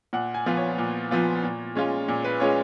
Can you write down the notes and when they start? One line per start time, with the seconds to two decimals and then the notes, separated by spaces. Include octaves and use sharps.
0.13 A#2 F#5
0.34 G#5
0.46 F3 B3 F4
0.57 C#5
0.78 A#2
1.11 F3 B3 F4
1.44 A#2
1.75 G#3 C#4 F4
2.08 A#2
2.24 B4
2.40 G#3 C#4 F4 C#5